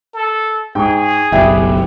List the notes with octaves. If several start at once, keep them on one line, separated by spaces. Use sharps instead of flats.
A4
G#2 G#4 G5 C#6
F#1 B1 B3 E4 G4 E5 G5